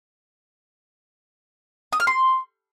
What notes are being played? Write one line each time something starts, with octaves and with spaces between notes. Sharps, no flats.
D#6
F6
C6